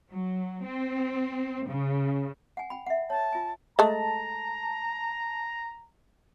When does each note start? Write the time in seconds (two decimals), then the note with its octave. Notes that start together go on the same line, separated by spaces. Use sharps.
0.10 F#3
0.65 C4
1.67 C#3
2.57 F#5 G#5
2.70 G5 B5
2.86 E5 F#5
3.10 C#5 A5
3.33 F4 G#5
3.79 G#3 A3 A5 A#5